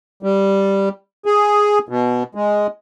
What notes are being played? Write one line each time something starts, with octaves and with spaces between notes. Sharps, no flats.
G3
G#4
B2
G#3